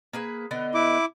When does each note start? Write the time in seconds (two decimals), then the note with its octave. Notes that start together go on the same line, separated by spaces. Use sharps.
0.13 A#3 G#4 B4
0.51 D3 B3 D#5
0.74 E4 D6